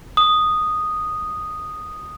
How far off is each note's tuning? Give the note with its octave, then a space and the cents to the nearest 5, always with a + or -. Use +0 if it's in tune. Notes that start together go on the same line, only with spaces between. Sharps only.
D#6 -5